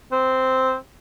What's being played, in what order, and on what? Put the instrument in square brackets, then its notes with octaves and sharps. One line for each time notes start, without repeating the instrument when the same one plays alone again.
[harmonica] C4